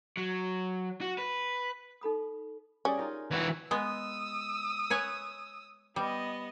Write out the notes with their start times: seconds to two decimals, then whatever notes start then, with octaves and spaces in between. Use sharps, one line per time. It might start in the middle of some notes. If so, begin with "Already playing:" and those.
0.17 F#3
1.01 F#4
1.18 B4
2.01 D#4 A4 B5 D#6
2.85 G3 C#4 G#4 D5
2.97 D#4 F4 A#4
3.31 E3 F#4
3.71 G#3 B3 D#6 E6
4.90 B4 C#5 G#5
5.96 G3 B3 D#5